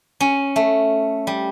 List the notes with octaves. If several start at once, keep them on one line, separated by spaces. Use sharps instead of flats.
C#4
A3
G3